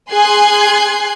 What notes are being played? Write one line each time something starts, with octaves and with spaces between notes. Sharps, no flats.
G#4 G#5 C6 F#6 G#6 C7